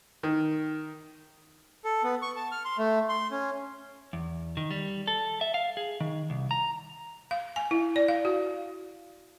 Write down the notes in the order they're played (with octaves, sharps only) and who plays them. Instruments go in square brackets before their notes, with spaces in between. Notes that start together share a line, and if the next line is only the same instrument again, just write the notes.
[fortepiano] D#3
[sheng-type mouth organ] A4
B3
C#6
A5
F6
C6
A3
C6
C#4
[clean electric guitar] E2
D#3
G3
A4
E5
F5
G#4
D#3
C2
A#5
[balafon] F5
G#5
E4
D5
F5
F#4